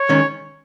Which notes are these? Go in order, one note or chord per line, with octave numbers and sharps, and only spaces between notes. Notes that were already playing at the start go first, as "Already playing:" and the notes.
Already playing: C#5
D#3 G#3 C#4